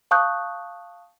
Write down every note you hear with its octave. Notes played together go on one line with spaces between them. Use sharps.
F5 A5 C#6 D#6 F#6 G6